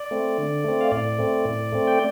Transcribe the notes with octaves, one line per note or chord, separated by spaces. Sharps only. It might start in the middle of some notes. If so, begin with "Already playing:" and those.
Already playing: D5
A3 C4
D3
A3 C4
F5
A2 D5
A3 C4
A2
A3 C4
G5